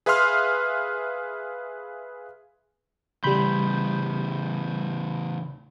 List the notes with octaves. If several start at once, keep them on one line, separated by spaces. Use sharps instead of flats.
G#4 B4 E5 F5 C6 F6
E2 A2 C#3 G3 B5 C6 G6